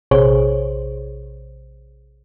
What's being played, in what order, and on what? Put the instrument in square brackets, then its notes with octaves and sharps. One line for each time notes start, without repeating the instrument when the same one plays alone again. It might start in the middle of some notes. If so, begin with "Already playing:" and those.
[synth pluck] A#1 C3 G#4 C5 C#5